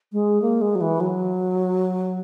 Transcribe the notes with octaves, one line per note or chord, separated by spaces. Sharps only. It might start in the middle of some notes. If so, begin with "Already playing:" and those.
G#3
A#3
G#3
F#3
E3
F#3